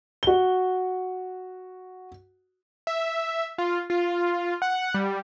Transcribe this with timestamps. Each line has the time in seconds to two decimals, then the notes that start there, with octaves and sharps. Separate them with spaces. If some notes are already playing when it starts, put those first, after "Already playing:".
0.23 F#4 G7
2.87 E5
3.58 F4
3.90 F4
4.62 F#5
4.94 G3